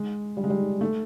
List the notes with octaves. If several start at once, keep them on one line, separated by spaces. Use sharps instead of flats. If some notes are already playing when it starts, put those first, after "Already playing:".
Already playing: G#3
G3
G#3
G3
A3